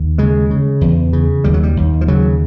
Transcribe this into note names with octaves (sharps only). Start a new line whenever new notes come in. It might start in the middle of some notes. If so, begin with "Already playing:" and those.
Already playing: D#2
C#3 G#3
C#3
E2
C#3
D#2 G3
F#3
G3
D#2
F3
C#3 F#3